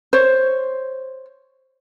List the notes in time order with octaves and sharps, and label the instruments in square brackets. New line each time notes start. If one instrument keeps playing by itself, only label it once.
[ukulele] C5 C#5